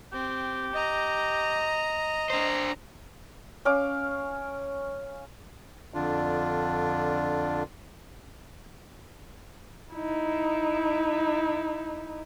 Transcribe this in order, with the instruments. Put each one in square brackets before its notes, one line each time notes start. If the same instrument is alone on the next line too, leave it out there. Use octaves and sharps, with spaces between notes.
[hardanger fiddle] C4 [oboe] G4
[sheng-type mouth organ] D#5 [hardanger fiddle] A#5
[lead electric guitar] D4 C5 [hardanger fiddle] A#5
[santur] C#4 F5 D6
[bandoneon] F2 D3 D4 F4
[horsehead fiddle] D#4 E4